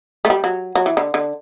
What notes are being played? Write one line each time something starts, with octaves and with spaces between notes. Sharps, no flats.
A3
G3
F#3
F#3
E3
D3
D3